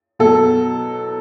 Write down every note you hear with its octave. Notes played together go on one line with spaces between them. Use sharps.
B2 F#3 A4